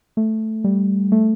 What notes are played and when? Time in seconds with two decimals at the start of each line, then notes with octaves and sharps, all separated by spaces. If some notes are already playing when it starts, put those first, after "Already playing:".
0.17 A3
0.64 G3
1.12 A3